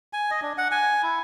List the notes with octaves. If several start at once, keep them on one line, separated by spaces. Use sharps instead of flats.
G#5
D#5
D4
F#5
G#5
E4